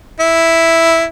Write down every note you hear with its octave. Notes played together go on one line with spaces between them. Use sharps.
E4